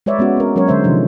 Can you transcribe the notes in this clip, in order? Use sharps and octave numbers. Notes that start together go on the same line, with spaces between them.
G#3 B4 C#5 D5 E5
G#3 B3 C#4 F#4
C4 A#4
F#3 G#3 C#4 A#4 C#5
D3 G#3 C5 E5
C3 D#3 F3